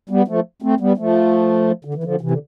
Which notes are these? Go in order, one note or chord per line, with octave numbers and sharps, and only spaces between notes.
G3 B3
F3 A3
A3 C4
G3 B3
F3 A3
D3
E3
D3 F3
C3 E3
D3